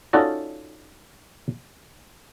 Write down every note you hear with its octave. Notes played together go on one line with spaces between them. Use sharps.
C#4 D#4 F4 F#4 A4 D5